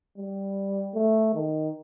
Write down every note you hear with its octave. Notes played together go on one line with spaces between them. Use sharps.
G3
A3
D#3